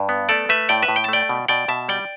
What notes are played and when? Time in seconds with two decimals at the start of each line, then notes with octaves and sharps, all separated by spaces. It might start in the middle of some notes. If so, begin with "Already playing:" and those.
Already playing: G2
0.09 B3
0.29 A3 A4 D5
0.49 A3 B4 E5
0.69 A2 D5 G5
0.82 B4 E5
0.89 A2
0.96 G5
1.04 A5
1.09 A3 D5 G5
1.29 B2
1.48 B2 D5 G5
1.68 B2 E5 A5
1.89 G3 D5 G5